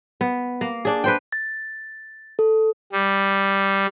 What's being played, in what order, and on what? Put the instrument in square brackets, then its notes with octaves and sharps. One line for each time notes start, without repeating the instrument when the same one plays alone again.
[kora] B3
A#3
D4 G#4
B4 C5 G5
[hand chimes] A6
A4
[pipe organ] G3